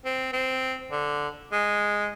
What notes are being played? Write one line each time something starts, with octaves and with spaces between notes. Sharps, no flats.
C4
C4
D3
G#3